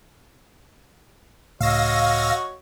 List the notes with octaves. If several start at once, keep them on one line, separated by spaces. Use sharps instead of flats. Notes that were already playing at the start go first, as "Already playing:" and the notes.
C#2 A2 F#4 C#5 D#5 F5 E6 A#6